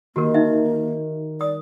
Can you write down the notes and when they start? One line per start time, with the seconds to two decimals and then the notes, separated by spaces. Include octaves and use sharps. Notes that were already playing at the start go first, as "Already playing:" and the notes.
0.16 D#3 A#3 F#4 G4 A#4
0.34 D#4 E5
1.41 D5 D#6